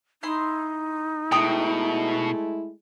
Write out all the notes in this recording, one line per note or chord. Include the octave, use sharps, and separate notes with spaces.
D#4 E4 C6
B2 G#3 A3 E4 G5 A#5 D#6